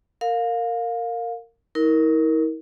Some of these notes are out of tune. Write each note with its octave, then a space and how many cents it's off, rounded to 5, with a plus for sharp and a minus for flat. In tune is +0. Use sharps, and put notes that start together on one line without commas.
A#4 -20 F5 +20
E4 -45 A#4 +0